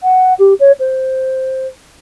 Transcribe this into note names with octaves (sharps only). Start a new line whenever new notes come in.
F#5
G4
C#5
C5